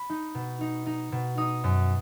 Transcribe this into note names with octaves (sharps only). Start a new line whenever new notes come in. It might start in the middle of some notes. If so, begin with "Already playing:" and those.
Already playing: B5
D#4
B2
D#4
D#4
B2
D#4 D#6
F#2